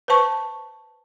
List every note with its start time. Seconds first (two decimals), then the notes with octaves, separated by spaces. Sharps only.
0.08 B4 C5 G5 A5 C#6